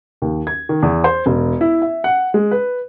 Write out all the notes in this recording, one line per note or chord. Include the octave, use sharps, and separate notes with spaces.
D#2
G#6
D#3
E2
C5
E1
E4
E5
F#5
G#3
B4